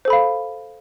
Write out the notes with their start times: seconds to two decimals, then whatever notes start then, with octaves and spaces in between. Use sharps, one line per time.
0.05 C5
0.08 A4
0.10 B5
0.13 F5